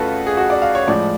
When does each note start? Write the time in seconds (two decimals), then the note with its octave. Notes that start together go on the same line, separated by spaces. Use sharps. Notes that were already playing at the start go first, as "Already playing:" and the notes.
Already playing: F2 C#3 A3 F4 F#4 A4 B4
0.27 G#4
0.37 F#4
0.50 D5
0.62 F5
0.75 C#5
0.87 A2 F3 G#3 D5